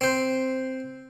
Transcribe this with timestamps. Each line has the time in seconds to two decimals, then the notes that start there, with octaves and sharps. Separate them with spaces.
0.01 C4 C5